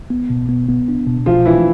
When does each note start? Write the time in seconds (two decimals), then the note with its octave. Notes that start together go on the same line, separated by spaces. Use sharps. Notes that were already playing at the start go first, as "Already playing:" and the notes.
0.10 B3
0.30 B2
0.49 B3
0.69 B3
0.88 D4
1.07 B2
1.26 C2 F3 F4
1.46 E3 D4 E4